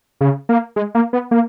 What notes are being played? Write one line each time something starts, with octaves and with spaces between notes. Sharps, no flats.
C#3
A#3
G#3
A#3
B3
A#3